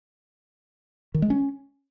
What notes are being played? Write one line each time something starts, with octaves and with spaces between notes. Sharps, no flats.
D#3
G#3
C#4